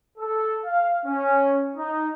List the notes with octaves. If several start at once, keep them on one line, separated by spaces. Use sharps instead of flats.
A4
F5
C#4
D#4